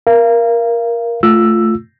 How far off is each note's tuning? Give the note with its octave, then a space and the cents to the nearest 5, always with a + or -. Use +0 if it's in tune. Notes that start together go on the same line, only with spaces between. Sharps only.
A#4 +10 F5 -30
A3 +0 F4 +0 E6 +5